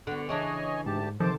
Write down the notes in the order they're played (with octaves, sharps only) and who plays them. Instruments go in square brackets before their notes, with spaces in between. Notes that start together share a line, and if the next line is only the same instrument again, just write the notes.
[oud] D3 B3 [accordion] F#4
[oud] C#3 E3 D4 [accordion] C#5 D#5 G#5
[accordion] D2 G4 A5 [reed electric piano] G#2
[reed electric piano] C3 D#3 A4 [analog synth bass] F3 [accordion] C5 A5 D6